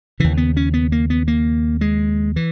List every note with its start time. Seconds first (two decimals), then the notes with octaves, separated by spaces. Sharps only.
0.20 D#2 C#3 E3
0.37 B3
0.57 C#4
0.74 B3
0.92 A#3
1.10 B3
1.28 A#3
1.81 G#3
2.36 E3